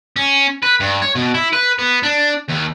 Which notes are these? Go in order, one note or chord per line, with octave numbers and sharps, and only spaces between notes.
C#4
B4
G2
C#5
B2
E4
B4
B3
D4
D#2